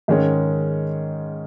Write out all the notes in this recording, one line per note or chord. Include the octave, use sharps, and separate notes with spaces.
G#2 D#3 G#3 C#4